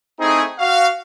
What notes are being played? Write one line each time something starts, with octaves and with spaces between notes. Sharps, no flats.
A3 C4 D#4 E4 G#4
F#4 F5